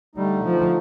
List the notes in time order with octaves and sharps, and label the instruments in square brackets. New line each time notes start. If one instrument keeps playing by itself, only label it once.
[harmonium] D3 A3 D#4 [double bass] G3
[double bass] F3